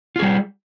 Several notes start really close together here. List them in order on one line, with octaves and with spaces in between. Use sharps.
F4 G#4 G3